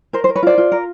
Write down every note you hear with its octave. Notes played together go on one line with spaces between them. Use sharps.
A#4 C5
C5
A#4
B4 C#5
F4 C5 D5
F4
A#4